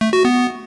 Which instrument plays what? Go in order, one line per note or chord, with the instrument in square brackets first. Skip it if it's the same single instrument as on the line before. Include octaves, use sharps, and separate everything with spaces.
[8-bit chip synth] A3
F#4
B3